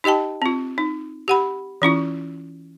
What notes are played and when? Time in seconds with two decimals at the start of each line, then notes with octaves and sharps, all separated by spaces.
0.04 D#4 G4 D#5 G5 A5
0.42 C4 F4
0.78 D#4
1.28 G4 F#5 B5
1.82 E3 C#4 E4 F4